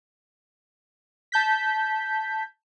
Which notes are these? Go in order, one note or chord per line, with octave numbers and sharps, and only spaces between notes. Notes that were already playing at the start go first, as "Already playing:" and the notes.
A5 G6 B6